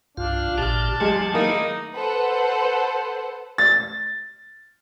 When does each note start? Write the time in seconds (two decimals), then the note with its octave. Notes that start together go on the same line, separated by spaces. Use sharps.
0.17 C2 G2 D4 F4 F5
0.58 A1 A#2 G4 A5 F6 F7
1.00 E2 F#3 G#3 A3 G4 G#4
1.34 D#3 A#3 D#4 E4
1.95 A4 B4 C5 F#5
3.58 A6